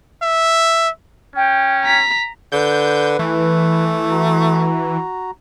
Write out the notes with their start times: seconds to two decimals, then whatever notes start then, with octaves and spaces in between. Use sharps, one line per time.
0.22 E5
1.35 C#4 G5
1.84 A#5 B6
2.52 D3 B4 G6
3.19 E3 A3
4.11 F#4 A#5